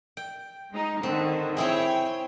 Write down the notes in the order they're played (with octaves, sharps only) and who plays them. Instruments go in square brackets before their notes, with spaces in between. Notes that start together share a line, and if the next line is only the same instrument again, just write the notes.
[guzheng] G5
[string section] G#3 D#4
[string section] D3 D#3 [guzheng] C4
[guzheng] C4 E4 G#4 [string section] C#5 G5